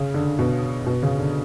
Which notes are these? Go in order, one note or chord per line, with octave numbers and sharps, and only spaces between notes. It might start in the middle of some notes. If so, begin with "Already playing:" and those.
Already playing: C#3
D3
B2
B2
C#3
D3